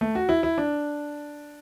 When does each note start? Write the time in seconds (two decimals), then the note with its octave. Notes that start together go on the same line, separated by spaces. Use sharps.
0.01 A3
0.15 F#4
0.29 E4
0.43 E4
0.58 D4